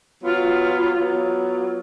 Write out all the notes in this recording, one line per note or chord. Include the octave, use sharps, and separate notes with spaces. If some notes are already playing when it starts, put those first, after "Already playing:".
F#3 B3 F4
F#3 B3 F4